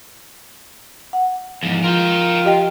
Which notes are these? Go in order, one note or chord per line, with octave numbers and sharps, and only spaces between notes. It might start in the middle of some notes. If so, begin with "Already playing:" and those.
F#5
E2 G#2 F3
F4 A#4 G5
G4 D#5 G5